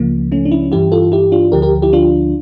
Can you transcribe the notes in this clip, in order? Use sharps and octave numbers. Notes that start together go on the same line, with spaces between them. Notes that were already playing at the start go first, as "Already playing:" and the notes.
Already playing: C#2 C#3 F3 A#3
A3 C#4
D4
C#4 E4
G2 E3 E4 G4
F4 A4
E4 G4
D4 F4
D2 D3 F3 G4 A#4
G4 A#4
E4 G4
D4 F4